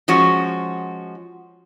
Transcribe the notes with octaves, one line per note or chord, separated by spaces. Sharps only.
F3 G#3 C#4 F#4